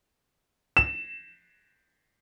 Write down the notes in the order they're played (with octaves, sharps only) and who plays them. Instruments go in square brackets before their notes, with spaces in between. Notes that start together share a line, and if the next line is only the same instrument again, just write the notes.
[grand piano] E7